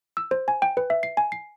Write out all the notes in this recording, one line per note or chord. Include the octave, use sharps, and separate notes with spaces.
E6
C5
G#5
G5
B4
E5
C7
G#5
C7